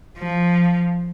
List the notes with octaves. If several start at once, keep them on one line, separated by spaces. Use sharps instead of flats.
F3